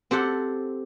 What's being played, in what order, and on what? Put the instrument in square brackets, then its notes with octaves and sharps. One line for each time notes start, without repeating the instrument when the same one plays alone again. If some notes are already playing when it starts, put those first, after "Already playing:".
[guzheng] C4 G4 A4 F#5